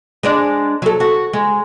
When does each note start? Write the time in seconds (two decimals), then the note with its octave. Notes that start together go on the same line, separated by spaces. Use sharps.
0.23 G#3 D4 D5
0.82 F#3 A4
1.00 F#4
1.33 G#3